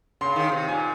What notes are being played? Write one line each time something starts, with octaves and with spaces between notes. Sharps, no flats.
C#3 C6
D#3
C3
A#2 G#5